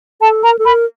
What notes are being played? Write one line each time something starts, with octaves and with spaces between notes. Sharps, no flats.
A4 A5
A#4 A#5
A4
A#4 B5